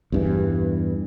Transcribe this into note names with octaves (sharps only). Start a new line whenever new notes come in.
E2 G2 E3